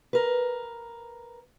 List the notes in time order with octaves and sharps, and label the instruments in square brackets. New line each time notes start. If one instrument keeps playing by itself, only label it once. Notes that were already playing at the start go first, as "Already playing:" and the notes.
[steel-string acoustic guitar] A#4 B4